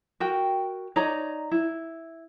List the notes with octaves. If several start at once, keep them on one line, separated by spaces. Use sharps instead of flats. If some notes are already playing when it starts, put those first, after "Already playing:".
F#4 A#4 G5
D#4 C#5 D5 A#5
E4